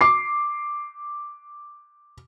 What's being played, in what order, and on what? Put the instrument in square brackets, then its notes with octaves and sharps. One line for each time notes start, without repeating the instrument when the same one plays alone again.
[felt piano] D6 C7